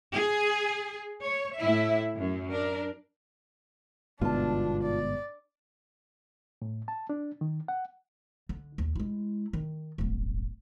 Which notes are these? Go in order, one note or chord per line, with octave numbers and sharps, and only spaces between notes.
G#4
C#5
A2 E4 E5
F#2
D4 A#4
G1 G#2 B2 D4 F4 A5
D5
A2
A5
D4
D#3
F#5
D3
D#2
G#3 E4
D#3
D1 G1